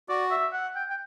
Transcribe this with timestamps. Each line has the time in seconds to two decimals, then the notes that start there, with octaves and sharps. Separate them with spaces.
0.09 F#4 D5
0.31 E5
0.53 F#5
0.76 G5
0.90 G5